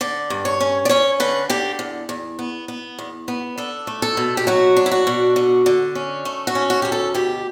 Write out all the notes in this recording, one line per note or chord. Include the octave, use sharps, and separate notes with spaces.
D3 D5
G2
C#5
C#4
D5
C#4 C#5
D3 B4
D3 G4
E2
E2
B3
B3
E2
B3
D4 A4
A3
A4
B2
G4
F#3 F#4
D4
E4
F#4
B2
D3
D3
C#4
A3
F#4
C#4
F#4
D2 G4
A4
B2 G4